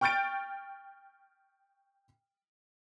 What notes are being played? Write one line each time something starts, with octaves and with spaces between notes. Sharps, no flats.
G5 C#6 F6 G6 A6 D7